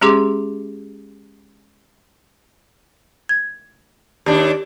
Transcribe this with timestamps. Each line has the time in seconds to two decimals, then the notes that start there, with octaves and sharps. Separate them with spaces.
0.01 G#3 C#4 G4 G#4 C6 D6
3.29 G#6
4.26 D#2 D4 G4